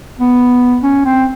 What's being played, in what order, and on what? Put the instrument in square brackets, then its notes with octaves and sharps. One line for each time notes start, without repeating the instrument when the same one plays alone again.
[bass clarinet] B3
C#4
C4